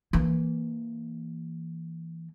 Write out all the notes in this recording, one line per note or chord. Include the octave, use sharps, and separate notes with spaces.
E3 A#3